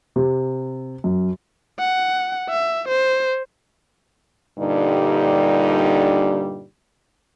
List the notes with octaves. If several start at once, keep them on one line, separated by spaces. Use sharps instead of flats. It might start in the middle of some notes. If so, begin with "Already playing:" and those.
C3
F#2
F#5
E5
C5
G2 A#2 D3 G3 D#4